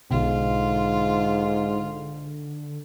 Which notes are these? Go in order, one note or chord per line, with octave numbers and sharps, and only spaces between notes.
B1 G#2 B2 D3 F4